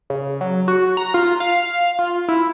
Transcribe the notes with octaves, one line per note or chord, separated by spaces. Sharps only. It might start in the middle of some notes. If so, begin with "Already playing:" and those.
C#3
F#3
F#4
A#5
F4
F5
F4
E4